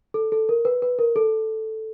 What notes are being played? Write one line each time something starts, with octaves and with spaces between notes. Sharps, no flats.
A4
A4
A#4
B4
B4
A#4
A4